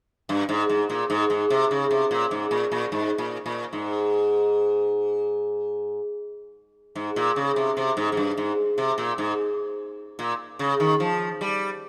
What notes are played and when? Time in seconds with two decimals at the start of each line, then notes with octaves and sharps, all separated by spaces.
0.29 G2
0.49 G#2
0.69 G#2
0.90 A#2
1.10 G#2
1.30 G#2
1.50 C3
1.71 C#3
1.91 C3
2.11 A#2
2.31 G#2
2.51 A#2
2.72 A#2
2.92 G#2
3.18 A#2
3.46 A#2
3.73 G#2
6.95 G#2
7.16 A#2
7.36 C#3
7.56 C3
7.77 C3
7.97 G#2
8.12 G#2
8.17 G2
8.38 G#2
8.78 C3
8.98 A#2
9.18 G#2
10.19 A#2
10.59 C#3
10.80 D#3
11.00 F3
11.41 G3